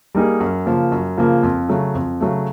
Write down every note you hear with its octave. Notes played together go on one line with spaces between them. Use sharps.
G3 A#3 D#4 G#4
F#2
C#3 F3 A#3
F#2
C#3 F3 A#3
F2
C#3 F#3 A3
F2
C#3 F#3 A3